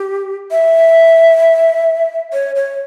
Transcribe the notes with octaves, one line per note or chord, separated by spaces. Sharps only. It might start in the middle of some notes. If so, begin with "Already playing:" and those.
Already playing: G4
E5
C#5
C#5